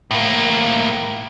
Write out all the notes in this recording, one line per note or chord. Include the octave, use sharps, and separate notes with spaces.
A2 A#3